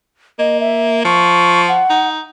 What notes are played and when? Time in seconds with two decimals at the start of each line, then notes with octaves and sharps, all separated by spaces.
0.39 A#3 D#5
0.60 E5
1.05 F3 C#6
1.68 F#5
1.90 D#4